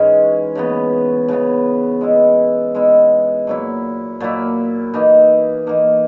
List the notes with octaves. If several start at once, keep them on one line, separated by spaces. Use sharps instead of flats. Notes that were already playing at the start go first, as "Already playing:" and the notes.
Already playing: G#2 E3 G#3 C#4
C#3 E3 B3
C#3 E3 B3
G#3 B3 E4
G#3 B3 E4
A#2 F#3 A#3 E4
A#2 F#3 A#3 E4
E3 A#3 D#4
E3 A#3 D#4